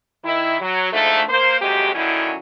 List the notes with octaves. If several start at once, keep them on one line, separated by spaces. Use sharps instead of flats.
D#3 E4
F#3
G#2 D3 F3 A3
A#3 C5
F2 C3 F#3 G#3 G4
D3 D#3 F#3 C#4 E4